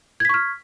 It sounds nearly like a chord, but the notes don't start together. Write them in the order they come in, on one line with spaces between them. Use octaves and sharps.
G#6 B6 C#6 F6